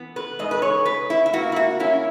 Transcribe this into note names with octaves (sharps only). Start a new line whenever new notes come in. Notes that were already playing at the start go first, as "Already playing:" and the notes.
Already playing: E3 B3
B4
G#2 D#5
B4
C#5
G#2 B4
E4
E4
A#3 F#4
E4
F#4
C#4 E4